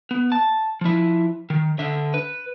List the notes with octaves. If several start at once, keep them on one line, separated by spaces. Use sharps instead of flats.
B3
A5
F3 E4
D#3
D3 E5
B4